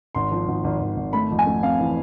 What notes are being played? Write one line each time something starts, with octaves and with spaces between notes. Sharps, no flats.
G#1 C6
F3
G#1
G#1
G#1
G#1
A3 B5
F2
G#5
A3
C4 F5
E3